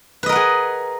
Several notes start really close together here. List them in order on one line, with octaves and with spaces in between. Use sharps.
B4 D#5 A#4 F#5 G#4